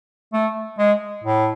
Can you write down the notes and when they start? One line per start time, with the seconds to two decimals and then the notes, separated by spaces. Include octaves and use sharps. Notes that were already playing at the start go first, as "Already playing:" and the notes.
0.33 A3
0.78 G#3
1.24 A2